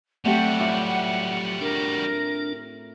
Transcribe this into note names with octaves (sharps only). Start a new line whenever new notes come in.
F#3 G3 A3 C4 F#4 G4 F#5
A2 F4 D6
D4 A#4